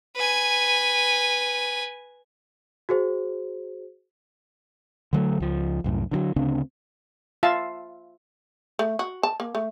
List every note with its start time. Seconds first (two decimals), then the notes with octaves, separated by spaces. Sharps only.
0.16 B4 G#5
2.89 F#4 G#4 C5
5.13 D3 F#3 A3
5.40 C#2 F3
5.84 C2 F#2 A2
6.11 D3 D#3 F#3
6.36 D2 C#3 C4 D4
7.43 F4 E5 F5 A5
8.79 A3
8.99 F#4
9.23 A5
9.40 A#3
9.55 A3